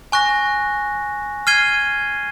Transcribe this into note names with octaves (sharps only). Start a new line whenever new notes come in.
G#5 C#6 F#6 A#6
F6 G#6 C7 D#7 G7